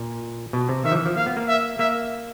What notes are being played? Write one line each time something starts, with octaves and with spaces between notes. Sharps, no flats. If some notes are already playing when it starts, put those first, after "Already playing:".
Already playing: A#2
B2
C3
D#3 E5
F3
E3
F3
A#3 F5
B3
A#3
E5
A#3 E5